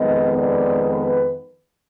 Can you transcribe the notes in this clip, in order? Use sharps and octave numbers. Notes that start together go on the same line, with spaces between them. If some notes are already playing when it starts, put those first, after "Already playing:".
Already playing: F2 D#3 G#3 B3 D#5
D5
B4